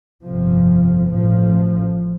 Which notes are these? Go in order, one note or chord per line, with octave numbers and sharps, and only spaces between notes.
G1 F2 C3 F3
A1 A2 F3